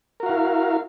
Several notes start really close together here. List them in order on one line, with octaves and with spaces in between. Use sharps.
A#4 F#4 F5 E4